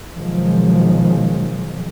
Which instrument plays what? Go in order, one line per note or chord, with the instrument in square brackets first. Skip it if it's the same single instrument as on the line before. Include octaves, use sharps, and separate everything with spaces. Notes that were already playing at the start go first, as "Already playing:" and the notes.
[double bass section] B2 D#3 F3 F#3 G#3